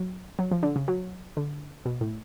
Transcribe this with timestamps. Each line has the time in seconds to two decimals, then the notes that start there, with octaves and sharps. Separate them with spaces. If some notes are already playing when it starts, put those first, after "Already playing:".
Already playing: F#3
0.39 F#3
0.51 F3
0.63 D3
0.76 C#3
0.88 F#3
1.37 D3
1.85 B2
2.01 A2